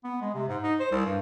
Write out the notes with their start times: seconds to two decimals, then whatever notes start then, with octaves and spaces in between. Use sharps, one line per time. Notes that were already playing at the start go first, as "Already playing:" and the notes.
0.04 B3
0.21 G#3
0.35 C3
0.48 G#2
0.63 D#4
0.80 C5
0.91 C2
1.06 G2